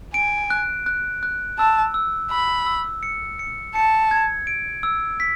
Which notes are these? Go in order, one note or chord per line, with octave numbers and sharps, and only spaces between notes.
G#5 D7
F#6
F#6
F#6
A5 E6
E6
B5 E6
E6
C#7
C#7
A5 C#7
G#6
D7
E6
B6